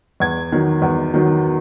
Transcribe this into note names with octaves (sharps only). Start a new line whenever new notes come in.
E2 G#6
D#3 F#3
E2
D#3 F#3